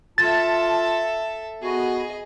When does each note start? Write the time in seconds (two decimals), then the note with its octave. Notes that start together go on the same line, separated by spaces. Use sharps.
0.18 F4 A4 E5 A5 A6
1.62 B3 F#4 G#4 D#5